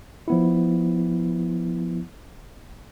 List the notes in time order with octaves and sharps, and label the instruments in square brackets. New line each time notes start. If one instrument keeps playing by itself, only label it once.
[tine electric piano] F3 B3 E4